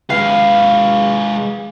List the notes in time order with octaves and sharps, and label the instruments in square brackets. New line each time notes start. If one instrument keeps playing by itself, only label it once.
[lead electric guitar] G#3 B4 [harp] F5